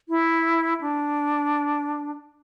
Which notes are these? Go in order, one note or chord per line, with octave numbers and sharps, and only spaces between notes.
E4
D4